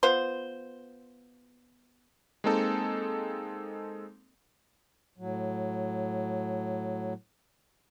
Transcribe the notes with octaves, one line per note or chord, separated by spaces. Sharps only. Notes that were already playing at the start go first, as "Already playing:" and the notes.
B3 F4 C5
G#3 A#3 C4 D#4 A4
A2 F#3